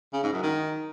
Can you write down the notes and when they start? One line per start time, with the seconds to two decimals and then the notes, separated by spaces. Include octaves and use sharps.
0.13 C#3
0.23 G#2
0.33 F#2
0.43 D#3